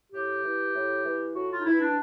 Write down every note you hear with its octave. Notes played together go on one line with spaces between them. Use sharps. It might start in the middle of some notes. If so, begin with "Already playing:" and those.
A2 G4
E3
A2
E3
A2 F#4
F4
D#4
E3 E4
D4